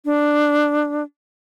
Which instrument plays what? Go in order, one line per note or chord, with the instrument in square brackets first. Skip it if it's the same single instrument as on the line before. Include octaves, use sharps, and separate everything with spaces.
[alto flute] D4